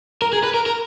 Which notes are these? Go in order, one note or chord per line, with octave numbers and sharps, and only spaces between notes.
A#4
G#4
B4
A#4
A#4